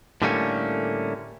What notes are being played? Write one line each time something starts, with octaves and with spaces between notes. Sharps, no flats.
A2 D3 G3 A3 A#3 C#4